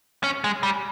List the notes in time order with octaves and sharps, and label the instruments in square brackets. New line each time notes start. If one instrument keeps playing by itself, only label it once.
[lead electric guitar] C#4
G#3
G3